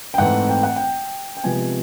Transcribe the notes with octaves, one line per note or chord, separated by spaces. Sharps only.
G5
G#2 E3 A3 C4 F#5
G5
F#5
G5
G5
C3 F3 G#3 B3 G#5